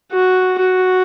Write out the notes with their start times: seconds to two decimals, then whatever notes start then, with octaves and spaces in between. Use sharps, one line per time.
0.12 F#4
0.59 F#4